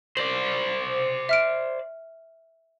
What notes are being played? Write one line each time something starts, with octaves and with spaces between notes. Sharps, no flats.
C5 D5 F#7
E5 F6 D7